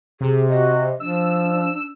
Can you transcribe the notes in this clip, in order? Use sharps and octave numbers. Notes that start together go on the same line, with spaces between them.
C3 G#4
F#4 D#5
F3 D4 E6